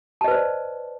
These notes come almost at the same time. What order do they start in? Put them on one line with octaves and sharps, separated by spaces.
A5 D#5 B4 C5 D5